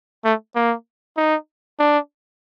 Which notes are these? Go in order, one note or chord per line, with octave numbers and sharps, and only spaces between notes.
A3
A#3
D#4
D4